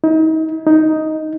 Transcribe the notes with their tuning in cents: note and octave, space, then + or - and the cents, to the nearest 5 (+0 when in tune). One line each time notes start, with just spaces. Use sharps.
D#4 +35
D#4 +5